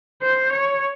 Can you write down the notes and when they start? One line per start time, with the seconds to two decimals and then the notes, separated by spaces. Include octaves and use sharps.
0.22 C5
0.53 C#5